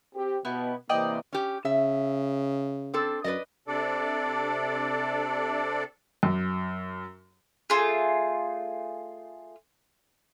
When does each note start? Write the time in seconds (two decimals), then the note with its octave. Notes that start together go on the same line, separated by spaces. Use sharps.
0.15 C4 G4
0.45 B2 B3 E4 G4
0.89 C3 E3 A#3 D5 D#5 G5
1.33 C#4 G4
1.65 C#3 E5
2.94 C4 D4 A4
3.24 F#2 B4 D5 D#5
3.68 C3 D4 A4 D5
6.23 F#2
7.70 A3 F4 G#4